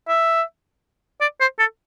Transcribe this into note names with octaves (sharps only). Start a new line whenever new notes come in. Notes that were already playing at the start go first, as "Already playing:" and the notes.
E5
D5
C5
A4